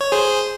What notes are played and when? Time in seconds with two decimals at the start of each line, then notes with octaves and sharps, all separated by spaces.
0.01 C#5
0.12 G#4 C5